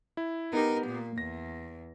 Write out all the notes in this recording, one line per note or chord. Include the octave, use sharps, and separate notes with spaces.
E4
B3 D#4 G4 A#4
A#2 A#3
E2 A#6